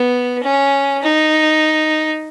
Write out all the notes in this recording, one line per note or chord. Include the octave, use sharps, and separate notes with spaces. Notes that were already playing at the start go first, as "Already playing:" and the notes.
Already playing: B3
C#4
D#4